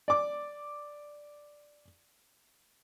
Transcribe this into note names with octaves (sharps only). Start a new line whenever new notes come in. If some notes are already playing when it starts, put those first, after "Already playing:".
D5 D6